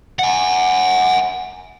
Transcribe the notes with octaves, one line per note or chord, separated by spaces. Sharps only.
F#5 G#5